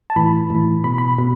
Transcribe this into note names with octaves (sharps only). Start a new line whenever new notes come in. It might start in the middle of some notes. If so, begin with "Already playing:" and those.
A5
A2 E3 B5
A2 E3
B2 B5
B5
B2